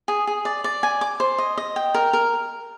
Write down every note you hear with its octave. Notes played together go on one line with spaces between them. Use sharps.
G#4
G#4
D5
D5
G#5
D6
C5
D#5
D#5
G5
A#4
A#4